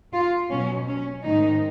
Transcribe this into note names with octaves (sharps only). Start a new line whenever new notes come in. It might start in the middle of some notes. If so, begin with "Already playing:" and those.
F4
B2 F#3 C#4
C#4
G#2 D#3 G#3 D#4